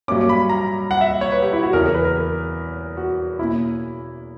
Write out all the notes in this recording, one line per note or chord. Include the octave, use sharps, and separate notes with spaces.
G2 F#3 A#3 C#4 D6
B5
A#5
F#5
E5
C#5
B4
G4
E4
F#4
E2 C#3 E3 A#4
A#4
B4
A#4
F#4
B2 A#3 C#4 E4